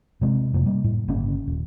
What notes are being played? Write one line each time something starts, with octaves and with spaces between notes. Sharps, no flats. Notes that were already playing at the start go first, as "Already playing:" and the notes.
C3 G#3 C4
F2 C3 A#3
G3 A#3
A2
G1 C#3 A#3 C#4
D#1